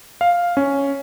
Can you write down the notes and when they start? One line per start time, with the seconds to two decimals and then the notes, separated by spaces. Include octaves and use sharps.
0.21 F5
0.57 C#4